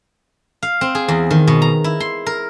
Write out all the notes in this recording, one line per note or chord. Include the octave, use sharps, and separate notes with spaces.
F5
C4
G#4
E2
D#3
B2
A#5
E4
C6
A#4